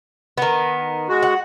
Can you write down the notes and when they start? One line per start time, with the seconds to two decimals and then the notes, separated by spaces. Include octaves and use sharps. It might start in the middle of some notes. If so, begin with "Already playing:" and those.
0.38 D#3 B3
1.09 G#3 F#4
1.23 F#5